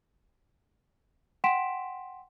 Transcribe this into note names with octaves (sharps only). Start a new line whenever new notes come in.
F#5 G5 C6 B6 D7 E7